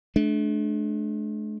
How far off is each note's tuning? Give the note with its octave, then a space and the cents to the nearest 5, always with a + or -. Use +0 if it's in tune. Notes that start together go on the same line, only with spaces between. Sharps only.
A3 -45 D4 +0